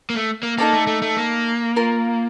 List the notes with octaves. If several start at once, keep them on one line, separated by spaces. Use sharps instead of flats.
A#3
A3
A#3
A#3 D#4 A4 D5 A5
A3
A3
A3
A#3
F4 A#4 F5